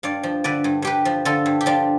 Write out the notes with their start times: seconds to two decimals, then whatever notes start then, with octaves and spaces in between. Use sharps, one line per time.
0.03 G2 D5 F5
0.23 F3
0.44 D3 B4 D5
0.64 G2
0.82 G2 G4 B4
1.05 F3
1.25 D3 F4 A4
1.46 G2
1.61 G4
1.66 F3 D4 F4